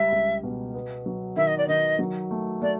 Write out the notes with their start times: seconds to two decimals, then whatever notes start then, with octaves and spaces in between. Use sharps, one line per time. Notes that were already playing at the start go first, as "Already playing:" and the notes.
Already playing: C#2 G3 E5
0.12 C#2
0.43 B2
0.74 B3
1.06 F#3
1.36 D#3 E5
1.47 D#5
1.57 D5
1.67 D#3 D#5
1.99 F#3
2.31 A3
2.61 A3 D5